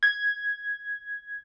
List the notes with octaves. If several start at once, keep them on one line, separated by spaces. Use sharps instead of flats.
G#6